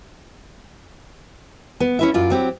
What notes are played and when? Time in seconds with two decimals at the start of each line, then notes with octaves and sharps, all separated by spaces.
1.80 B3
1.99 C#4 E4 E5
2.14 F#2 F4 D5
2.30 F#3 C4 G4